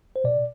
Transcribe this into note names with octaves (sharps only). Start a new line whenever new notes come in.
C5
B2 D5